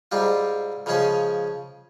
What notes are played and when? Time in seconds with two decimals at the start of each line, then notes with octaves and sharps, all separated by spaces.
0.12 G#2 G3 C4 F4
0.86 C#3 F3 G#3 C#4 G#4